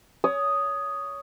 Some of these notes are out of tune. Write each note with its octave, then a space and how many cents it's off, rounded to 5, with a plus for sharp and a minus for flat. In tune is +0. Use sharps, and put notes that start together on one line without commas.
C#5 +20 D#6 +0